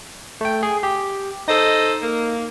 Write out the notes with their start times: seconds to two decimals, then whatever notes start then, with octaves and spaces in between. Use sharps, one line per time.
0.41 A3 G5
0.63 G#4
0.83 G4
1.48 D#4 A4 C5 D#5
2.02 A#3